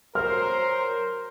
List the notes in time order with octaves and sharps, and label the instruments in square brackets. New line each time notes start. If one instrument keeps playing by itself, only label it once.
[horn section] F#3 C5 [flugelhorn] A#4 [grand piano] F6